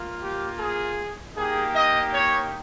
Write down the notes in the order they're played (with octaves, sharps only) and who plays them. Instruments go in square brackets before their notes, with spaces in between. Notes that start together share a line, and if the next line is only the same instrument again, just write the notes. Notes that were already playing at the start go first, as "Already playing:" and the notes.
Already playing: [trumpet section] A#3 F4
G4
G#4
A#3 D#4 G4 G#4
D#5
C#5